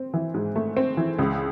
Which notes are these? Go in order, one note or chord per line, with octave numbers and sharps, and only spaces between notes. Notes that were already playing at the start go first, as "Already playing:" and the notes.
Already playing: C4
E3
G#2
A3
C4
E3
C#2